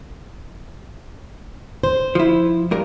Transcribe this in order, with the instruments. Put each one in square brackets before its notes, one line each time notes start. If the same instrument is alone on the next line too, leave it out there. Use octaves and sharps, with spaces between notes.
[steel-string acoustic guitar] C5
[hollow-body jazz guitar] F3 E4
G2 A#4